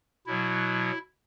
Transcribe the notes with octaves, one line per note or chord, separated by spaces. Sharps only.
B2 F#3 E4